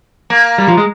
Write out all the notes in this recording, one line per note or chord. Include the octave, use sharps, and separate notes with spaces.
A#3
G3
F3
G#3